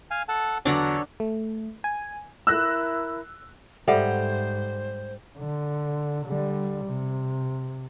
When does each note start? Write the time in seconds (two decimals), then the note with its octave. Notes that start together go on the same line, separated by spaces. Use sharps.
0.11 F5 G#5
0.29 A4 F#5 A5
0.65 E2 D3 F#3 D4 A4 C#5 F#5 A#5
1.20 A3
1.84 G#5
2.47 E4 A#4 E6 F#6 A#6
3.88 G#2 G3 A4 C5 E5 F#5
5.38 D3
6.26 D3 G3
6.85 C3